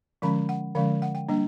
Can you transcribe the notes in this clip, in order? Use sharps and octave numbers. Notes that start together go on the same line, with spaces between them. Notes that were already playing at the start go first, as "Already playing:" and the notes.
D3 F3 G#3 C#4 B5
F#5
D3 F3 G#3 C#4 F5
F#5
G5
G3 A#3 D4